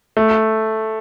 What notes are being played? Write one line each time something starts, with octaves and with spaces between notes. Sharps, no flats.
A3